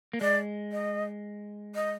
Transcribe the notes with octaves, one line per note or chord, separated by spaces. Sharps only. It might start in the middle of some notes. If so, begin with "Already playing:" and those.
A#3
G#3 D5
D#5
D#5